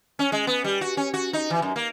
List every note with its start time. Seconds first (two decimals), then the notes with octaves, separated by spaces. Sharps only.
0.19 C#4
0.32 G#3
0.47 B3
0.64 G3
0.81 F#4
0.97 C#4
1.14 F#4
1.33 D#4
1.50 E3
1.62 F#2
1.76 A#3